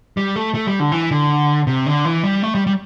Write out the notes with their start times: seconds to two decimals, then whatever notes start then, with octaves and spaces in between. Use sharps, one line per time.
0.17 G3
0.36 A3
0.55 A3
0.67 G3
0.80 D3
0.92 E3
1.11 D3
1.67 C3
1.86 D3
2.05 E3
2.23 G3
2.42 A3
2.55 G3
2.67 G3